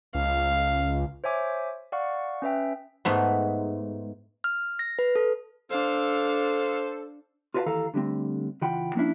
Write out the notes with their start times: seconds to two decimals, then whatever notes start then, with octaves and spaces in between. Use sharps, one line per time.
0.15 C#2 F5
1.24 C5 C#5 E5 G#5 D6
1.92 D5 F5 F#5 C#6
2.42 C#4 B4 E5 G5
3.05 G#2 A3 B3
4.44 F6
4.79 A#6
4.99 B4
5.16 A4
5.71 D4 A4 C5 F5
7.54 F4 F#4 B4 C#5 F5 A5
7.66 D#2 E3 A4 F5 A#5
7.94 D3 G3 A3 C4
8.62 C#2 E3 F4 F#5 G5 B5
8.95 F3 A#3 C#4 D4 E4